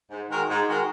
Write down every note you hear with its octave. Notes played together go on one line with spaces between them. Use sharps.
G#2
D#3 G#3 F#4 A#4
G#2
D#3 G#3 F#4 A#4